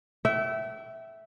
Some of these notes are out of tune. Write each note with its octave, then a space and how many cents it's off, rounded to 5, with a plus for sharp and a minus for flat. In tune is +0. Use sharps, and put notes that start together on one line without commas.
E5 +0 G5 -40